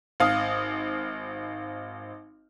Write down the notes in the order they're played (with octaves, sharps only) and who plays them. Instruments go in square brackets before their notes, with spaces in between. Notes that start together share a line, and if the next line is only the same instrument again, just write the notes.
[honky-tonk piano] G#1 F5 D#6